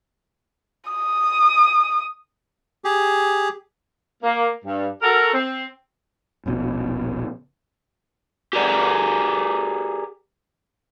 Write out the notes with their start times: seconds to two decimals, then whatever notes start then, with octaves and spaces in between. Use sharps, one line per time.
0.91 D#6
2.84 G4 G#4
4.23 A#3
4.64 G2
5.02 F#4 A4 A#4
5.33 C4
6.46 D#1 A#1 B2
8.53 G4 G#4 A#4 D5